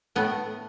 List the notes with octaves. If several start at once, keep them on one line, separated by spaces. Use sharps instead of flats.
A2 A3 B3